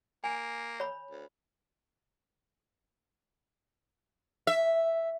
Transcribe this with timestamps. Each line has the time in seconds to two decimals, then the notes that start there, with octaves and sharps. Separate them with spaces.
0.24 A#3 G#5
0.80 C#5 B5
1.11 D2
4.47 E5